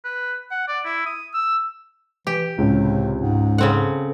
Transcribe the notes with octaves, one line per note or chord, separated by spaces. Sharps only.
B4
F#5
D5
E4
D#6
E6
E3 G4
C#2 A2 C3
G#2
C#3 C4 A4 F#5